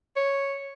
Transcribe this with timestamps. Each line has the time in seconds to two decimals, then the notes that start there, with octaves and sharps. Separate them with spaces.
0.16 C#5